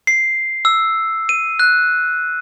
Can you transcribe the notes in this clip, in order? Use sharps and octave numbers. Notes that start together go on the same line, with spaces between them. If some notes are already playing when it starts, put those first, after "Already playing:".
C7
E6
D#7
F#6